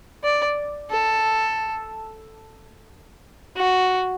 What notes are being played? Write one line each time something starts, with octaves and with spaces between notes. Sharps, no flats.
D5
A4
F#4